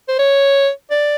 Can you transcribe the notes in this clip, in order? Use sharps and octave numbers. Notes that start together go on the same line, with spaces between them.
C5
C#5
D5